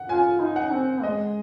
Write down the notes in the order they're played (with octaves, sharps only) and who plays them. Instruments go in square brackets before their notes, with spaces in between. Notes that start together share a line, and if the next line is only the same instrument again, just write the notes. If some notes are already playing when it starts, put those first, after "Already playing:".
Already playing: [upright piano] F#5
[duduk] F4 [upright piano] G#5
[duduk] D#4
[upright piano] F#5
[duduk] C4
[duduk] G#3 [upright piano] D#5